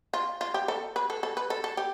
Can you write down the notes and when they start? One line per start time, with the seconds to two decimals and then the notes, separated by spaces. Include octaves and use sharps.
0.14 F4
0.41 F4
0.54 G4
0.68 A4
0.96 B4
1.10 A4
1.23 A4
1.37 B4
1.50 A4
1.64 A4
1.77 G4